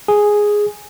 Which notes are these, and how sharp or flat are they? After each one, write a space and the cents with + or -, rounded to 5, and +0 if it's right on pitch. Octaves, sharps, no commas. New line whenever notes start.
G#4 +0 G#5 +0